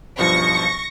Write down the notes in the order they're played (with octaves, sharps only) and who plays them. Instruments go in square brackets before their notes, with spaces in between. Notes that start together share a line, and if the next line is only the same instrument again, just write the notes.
[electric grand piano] B1 G2 F3 [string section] C#6 A#6